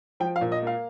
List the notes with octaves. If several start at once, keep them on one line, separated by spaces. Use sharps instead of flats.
F3 G5
F5
A#2
D#5
A#3 F5